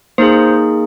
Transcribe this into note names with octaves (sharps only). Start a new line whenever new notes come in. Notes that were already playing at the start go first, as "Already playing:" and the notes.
A#3 D#4 G#4 C5